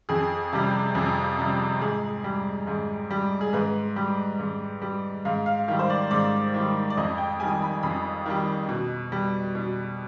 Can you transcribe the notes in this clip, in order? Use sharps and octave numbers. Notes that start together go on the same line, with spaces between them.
F2 G#4
C3 G3
F2
C3 G3
G#2 G#4
G3
G#2
G3
G#4
G#2 B4
G3
G#2
G3
G#2 F5
F5
D#3 G3 F5
C5
D5
G#2 D5
D#3 G3
D5
F2 D#5
G5
D#3 G3 G#5
B5
F2 B5
D#3 G3
B2
G3
B2